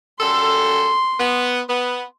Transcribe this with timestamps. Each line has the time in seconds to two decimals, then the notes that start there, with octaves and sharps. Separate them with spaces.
0.20 F#2 G3 A4 C6
1.19 B3
1.68 B3